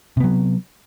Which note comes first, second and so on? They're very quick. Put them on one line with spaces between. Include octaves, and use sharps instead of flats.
C3 B3 F#3